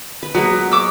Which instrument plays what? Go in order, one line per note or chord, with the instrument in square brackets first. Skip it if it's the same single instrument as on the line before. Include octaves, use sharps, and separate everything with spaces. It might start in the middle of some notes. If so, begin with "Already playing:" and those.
[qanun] B4
[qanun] F#3 G#3 A#3 [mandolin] B3
[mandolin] C#5 D6 E6